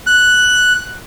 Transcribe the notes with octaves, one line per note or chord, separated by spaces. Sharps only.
F#6